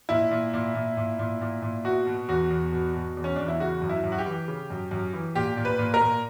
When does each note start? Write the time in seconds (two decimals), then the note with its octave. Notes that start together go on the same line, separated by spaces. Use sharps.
0.09 A#2 E4
0.31 A#2
0.54 A#2
0.75 A#2
0.97 A#2
1.19 A#2
1.41 A#2
1.62 A#2
1.84 B2 F#4
2.07 B2
2.28 E2 F#4
2.50 E2
2.72 B2
2.95 B2
3.17 E2
3.24 C#4
3.36 E2 D4
3.48 E4
3.60 C#3 F#4
3.82 F#2
3.89 E4
4.04 F#2
4.12 F#4
4.18 G4
4.26 E3
4.48 C#3
4.70 F#2
4.91 F#2
5.14 E3
5.35 A#2 G4
5.57 A#2
5.65 B4
5.79 A#2
5.94 A#4
6.01 A#2